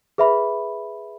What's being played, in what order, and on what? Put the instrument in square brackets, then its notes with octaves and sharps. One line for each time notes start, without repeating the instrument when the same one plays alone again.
[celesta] G#4 B4 E5 B5